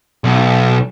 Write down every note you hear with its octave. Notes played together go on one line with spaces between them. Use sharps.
B1